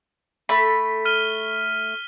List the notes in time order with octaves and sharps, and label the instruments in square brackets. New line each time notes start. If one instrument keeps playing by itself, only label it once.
[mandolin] A3 B5 [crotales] B6
[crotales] F6 D#7 G7